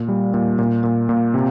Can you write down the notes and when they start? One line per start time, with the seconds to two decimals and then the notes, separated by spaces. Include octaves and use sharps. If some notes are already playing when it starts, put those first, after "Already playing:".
Already playing: A#2
0.08 G3
0.34 A#2
0.59 A#2
0.83 A#2
1.09 A#2
1.34 C3